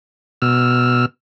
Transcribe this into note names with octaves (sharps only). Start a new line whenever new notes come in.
B2 E6 F6